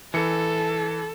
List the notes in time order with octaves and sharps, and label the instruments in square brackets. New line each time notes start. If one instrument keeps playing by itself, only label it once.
[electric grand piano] E3 C#7 [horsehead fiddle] A4